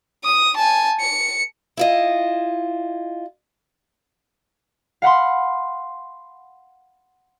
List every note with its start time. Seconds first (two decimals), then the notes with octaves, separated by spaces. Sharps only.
0.24 D#6
0.56 G#5 A5
1.00 C#7
1.77 E4 F4 D#5
5.02 F5 F#5 B5 C6